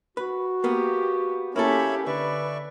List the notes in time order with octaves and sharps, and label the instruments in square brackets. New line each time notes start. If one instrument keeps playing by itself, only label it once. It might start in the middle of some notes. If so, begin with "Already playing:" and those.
[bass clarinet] F#4 [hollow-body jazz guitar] B4
[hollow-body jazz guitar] A#3 B3 [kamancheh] G4
[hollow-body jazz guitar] A#3 E4 A4 [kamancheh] C#4 G4 [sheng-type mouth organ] C#5 E5 B5
[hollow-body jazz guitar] D3 [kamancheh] B4 [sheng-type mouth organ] D5 E5 C#6